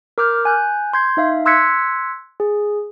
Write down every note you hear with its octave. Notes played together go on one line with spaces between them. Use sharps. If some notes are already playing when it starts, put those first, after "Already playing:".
A#4 D6 F6 G6
G#5 F#6 G6
C6 G6 G#6 C7
D#4 E5 F5
C6 E6 F#6 G#6 B6 C#7
G#4